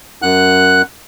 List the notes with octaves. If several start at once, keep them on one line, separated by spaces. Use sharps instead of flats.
F#2 F#5 F#6